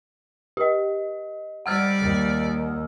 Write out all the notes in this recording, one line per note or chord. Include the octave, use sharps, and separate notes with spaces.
G4 D#5
G3 D5 F#5 E6 F6
D#2